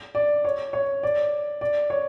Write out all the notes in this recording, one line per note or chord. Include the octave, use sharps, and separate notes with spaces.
D5
C#5
C#5
D5
D5
C#5